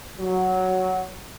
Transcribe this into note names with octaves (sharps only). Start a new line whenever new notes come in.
F#3